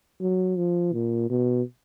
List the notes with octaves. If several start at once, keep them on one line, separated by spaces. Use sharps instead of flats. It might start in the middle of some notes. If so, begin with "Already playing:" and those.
F#3
F3
A#2
B2